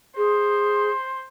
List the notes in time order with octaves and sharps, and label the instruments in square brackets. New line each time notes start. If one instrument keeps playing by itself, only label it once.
[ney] G#4 [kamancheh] C5